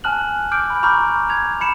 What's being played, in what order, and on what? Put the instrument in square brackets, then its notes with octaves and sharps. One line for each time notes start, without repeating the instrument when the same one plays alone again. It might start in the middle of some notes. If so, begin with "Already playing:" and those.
[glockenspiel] G#5 A5 F6 F#6 F#7
D6 F6 G6 D7
B5
A#5 B5 C#6 D6 F6 G6
G#6 F7
B5 C#7 E7